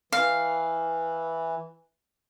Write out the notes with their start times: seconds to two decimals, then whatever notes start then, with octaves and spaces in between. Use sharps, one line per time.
0.12 E3 F5